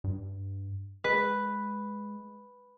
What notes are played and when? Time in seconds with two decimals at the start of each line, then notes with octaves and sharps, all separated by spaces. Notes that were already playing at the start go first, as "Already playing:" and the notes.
0.04 G2
1.04 G#3 B4